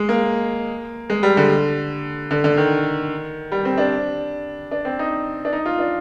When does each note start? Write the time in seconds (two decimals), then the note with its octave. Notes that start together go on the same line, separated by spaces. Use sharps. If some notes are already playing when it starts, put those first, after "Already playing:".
Already playing: G#3
0.09 A#3
1.10 G#3
1.23 G3
1.37 D3
2.31 D3
2.44 D3
2.57 D#3
3.52 G3
3.65 C4
3.78 D4
4.71 D4
4.85 C4
4.99 D#4
5.45 D4
5.53 D#4
5.66 F4
5.79 D4